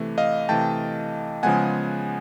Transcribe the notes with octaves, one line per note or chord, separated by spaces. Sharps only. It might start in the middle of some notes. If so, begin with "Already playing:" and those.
Already playing: C3 E3 A3
D#5 F5
C3 E3 A3 G5 A5
C#3 F3 G#3 B3 F#5 G#5